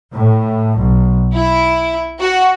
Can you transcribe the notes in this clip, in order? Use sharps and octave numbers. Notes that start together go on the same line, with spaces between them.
A2
B1
E4
F#4